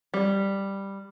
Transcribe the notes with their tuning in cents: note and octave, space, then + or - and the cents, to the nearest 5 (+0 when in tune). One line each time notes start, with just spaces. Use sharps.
G3 +5